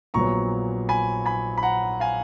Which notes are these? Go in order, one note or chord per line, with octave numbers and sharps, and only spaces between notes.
A#1 A#2 F#3 B3 A#5 C#6
G#5 B5
G#5 B5
B5
F#5 A#5
F5 G#5